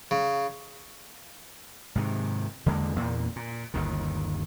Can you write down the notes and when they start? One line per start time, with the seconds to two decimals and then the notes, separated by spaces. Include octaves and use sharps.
0.11 C#3
1.95 G#2 C3 D#3
2.66 E2 D3 G#3 A#3
2.96 E2 A#2 A#3
3.36 A#2
3.74 G1 D#2 D#3